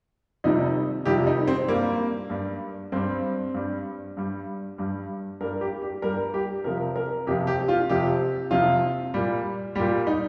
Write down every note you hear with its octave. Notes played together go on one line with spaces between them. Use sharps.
F2 C3 D#3 G3 D#4
F2 C3 D#3 G3 G4
D#4
C4
G2 G3 A#3
G2 G3
G2 G3 C4
G2 G3
G2 G3
G2 G3
G2 G3 A#4
G4
G4
G2 G3 A#4
G4
F2 C3 F3 A#4
A#4
F2 C3 F3 G4
G4
F4
F2 C3 F3 G4
F2 C3 F3 F4
A#2 G3
A#2 G3 G4
D#4